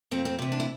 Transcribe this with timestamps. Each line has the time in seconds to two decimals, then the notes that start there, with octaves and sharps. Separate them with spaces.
0.11 F2 C4
0.25 C4
0.38 C3 E3
0.52 D4
0.60 E4